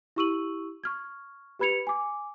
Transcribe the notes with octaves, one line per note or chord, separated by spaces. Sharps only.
E4 G4 C#6 E6 D#7 F#7
C#6 F6 G#6
G4 B4 B5 G#6 C#7 F7
G#5 D6